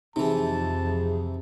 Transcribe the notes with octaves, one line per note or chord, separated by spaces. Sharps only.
F2 C3 E3 D#4 G#4 A5